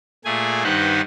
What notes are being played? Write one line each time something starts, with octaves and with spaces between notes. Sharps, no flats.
A#2 A3 G#4 G#5
G2 D#3 D#4 B4 C5 F#5